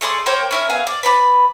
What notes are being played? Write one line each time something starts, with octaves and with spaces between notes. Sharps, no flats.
A3 G#4 D5 C6
A#3 C5 C#5 G5
C#4 E4 A#4
B3 G#4 F5
D5
B4 D5 B5